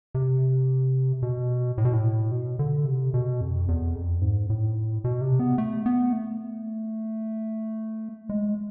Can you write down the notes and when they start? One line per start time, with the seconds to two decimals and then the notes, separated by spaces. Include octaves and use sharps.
0.15 C3
1.22 B2
1.78 A2
1.85 B2
1.93 A2
2.31 B2
2.59 D3
2.86 C3
3.14 B2
3.41 F2
3.68 E2
3.95 F2
4.22 G#2
4.50 A2
5.04 B2
5.21 C3
5.40 B3
5.58 A3
5.86 B3
6.13 A3
8.29 G#3